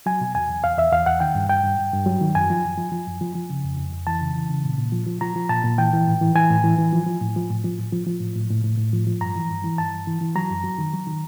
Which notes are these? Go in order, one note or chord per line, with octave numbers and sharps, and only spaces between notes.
F#3 G#5
B2
E2 G#5
E2
E2 F5
E2 E5
E2 F5
E2 F#5
D#3 G5
G2
G2 G5
G2
G2
G2
F#3
D#3
F#2 G#5
F3
F#2
F3
F3
F#2
F3
F3
C#3
F2
F2
F2
E3 A5
C#3
E3
C#3
A#2
A#2
F3
F3
F3 A#5
F3
A#2 A5
A#2
E3 G5
E3
A2
E3
E3 G#5
A2
E3
E3
F3
F3
A2
F3
A2
F3
A2
F3
F3
A2
A2
A2
A2
A2
F3
F3
G2 A#5
E3
G2
E3
G2 A5
G2
E3
E3
F#3 A#5
F#2
F#3
D#3
F#3
D#3